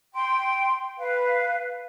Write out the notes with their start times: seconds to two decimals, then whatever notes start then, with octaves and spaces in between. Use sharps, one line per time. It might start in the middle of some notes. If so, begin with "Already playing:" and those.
0.14 G5 C6
0.98 B4 F5